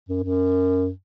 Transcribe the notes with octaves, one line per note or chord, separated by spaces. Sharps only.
F#2
F#2